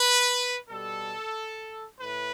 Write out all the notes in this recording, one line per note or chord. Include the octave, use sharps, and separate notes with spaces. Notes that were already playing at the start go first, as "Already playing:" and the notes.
Already playing: B4
B2 G3 A4
A2 B4